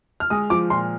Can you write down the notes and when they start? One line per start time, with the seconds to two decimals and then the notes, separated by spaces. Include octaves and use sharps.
0.20 F6
0.30 G#3 D#6
0.50 F3 D6
0.70 A#2 C6